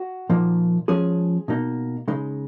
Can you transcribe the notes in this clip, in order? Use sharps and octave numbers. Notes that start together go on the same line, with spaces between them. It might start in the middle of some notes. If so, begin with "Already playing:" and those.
Already playing: F#4
A#2 F3 A#3 D#4
F3 G#3 C#4 G#4
B2 A#3 D#4
C#3 G#3 D#4